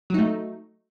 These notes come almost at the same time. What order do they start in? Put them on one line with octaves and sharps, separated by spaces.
F#3 D#4 A3